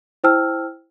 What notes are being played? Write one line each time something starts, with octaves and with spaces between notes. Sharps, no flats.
E4 C5 G5 A5 E6 F6